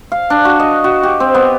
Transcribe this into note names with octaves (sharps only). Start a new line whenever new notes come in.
F5
D4
F#4
D#5
F#4
G4
C4
B3